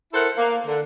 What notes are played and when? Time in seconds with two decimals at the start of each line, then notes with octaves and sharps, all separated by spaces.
0.13 E4 A4 A#4 C5 E5 F#5
0.37 A#3
0.66 D3